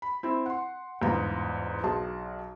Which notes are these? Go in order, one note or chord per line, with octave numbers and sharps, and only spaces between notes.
B5
C4 E4
F#5 C6
G1 E2 G#2 F4 A#5
B1 F#3 G#4 A5 C6